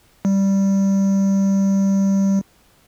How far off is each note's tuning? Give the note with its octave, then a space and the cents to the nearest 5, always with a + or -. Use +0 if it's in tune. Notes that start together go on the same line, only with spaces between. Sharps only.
G3 -5